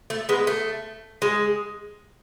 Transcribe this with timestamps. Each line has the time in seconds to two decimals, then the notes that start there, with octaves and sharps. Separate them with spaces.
0.10 A3
0.29 G#3 B3
0.47 A3
1.22 G#3